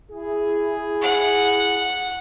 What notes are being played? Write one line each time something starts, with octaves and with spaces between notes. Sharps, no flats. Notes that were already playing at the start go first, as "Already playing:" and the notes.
E4 G#4
F#5